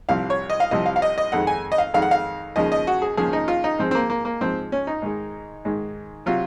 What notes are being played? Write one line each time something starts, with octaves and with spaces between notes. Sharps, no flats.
C2 C3 F3 F5
C#5
D#5
F5
C2 C3 F3 D#5
F5
F5
D#5
D#5
F2 D#3 G#3 F#5
G#5
D#5
F5
F2 D#3 G#3 F5
F#5
F5
D#2 C#3 F3 G#3 D#5
D#5
F#4
G#4
D#2 C#3 F3 G#3 G#4
D#4
F4
D#4
G#2 F3 G#3 C4
C4
A#3
A#3
A#3
G#2 F3 G#3 C4
C#4
D#4
G#2 D#3 G#3
G#2 D#3 G#3
C3 F#3 F4